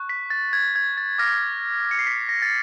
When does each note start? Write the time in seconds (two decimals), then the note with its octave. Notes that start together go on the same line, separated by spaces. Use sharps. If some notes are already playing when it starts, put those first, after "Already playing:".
Already playing: C#6 F#6
0.09 B6
0.30 A6
0.53 G#6
0.76 G#6
0.97 A6
1.18 D6 F6 A#6
1.91 C#7
1.99 C7
2.07 B6
2.29 A#6
2.42 A6